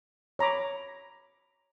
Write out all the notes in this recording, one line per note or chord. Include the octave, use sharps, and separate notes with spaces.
C#5 A#5 B5 D6